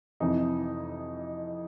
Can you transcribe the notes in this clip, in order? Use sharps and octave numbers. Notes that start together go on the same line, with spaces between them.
F2 C3 E3 D#4